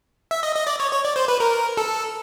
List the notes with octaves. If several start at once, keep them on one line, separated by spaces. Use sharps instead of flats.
E5
D#5
D#5
D5
C#5
C#5
D5
C5
B4
A#4
A4